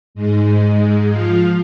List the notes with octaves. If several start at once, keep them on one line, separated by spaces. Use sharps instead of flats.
G#2 G#3
F3 F4